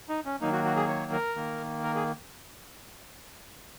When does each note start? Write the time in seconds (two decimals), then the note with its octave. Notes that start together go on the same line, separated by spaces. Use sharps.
0.09 D#4
0.25 C#4
0.41 D#3 F#3 A#3 D#4
0.53 F#4
0.64 F#4
0.77 G#4
0.88 C#5
1.12 A#4
1.36 D#3 A#3
1.83 A#4
1.95 G#4